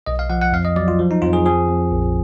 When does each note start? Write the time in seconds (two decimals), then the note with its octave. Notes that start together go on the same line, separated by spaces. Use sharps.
0.06 B1 D#5
0.19 F5
0.30 F3 F#5
0.42 F#5
0.53 F2 F5
0.65 D#5
0.76 F#3 D5
0.88 F4
0.99 F3
1.11 D#4
1.22 F2 F4
1.33 G#4
1.46 F3 G#4
1.68 F2
1.91 A#1